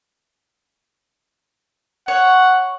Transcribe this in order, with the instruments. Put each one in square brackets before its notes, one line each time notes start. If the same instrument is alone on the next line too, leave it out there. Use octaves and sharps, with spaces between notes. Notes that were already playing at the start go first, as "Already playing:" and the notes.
[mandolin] C#5 [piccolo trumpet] F#5